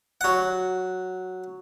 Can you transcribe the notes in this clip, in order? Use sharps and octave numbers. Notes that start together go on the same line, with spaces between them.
F#3 F#5